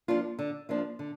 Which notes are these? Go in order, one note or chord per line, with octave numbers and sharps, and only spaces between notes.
F3 A#3 D4 F4
D3
F3 A#3 D4 F4
D3